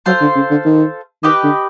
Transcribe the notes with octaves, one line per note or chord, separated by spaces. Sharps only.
F#3 F4 A4 C5 F5
D3
C#3
D3
D#3
D#3 G4 B4 D#5 G5
D3